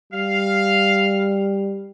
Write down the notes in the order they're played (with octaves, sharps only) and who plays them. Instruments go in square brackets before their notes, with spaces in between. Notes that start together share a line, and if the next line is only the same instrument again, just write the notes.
[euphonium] G3 [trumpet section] F5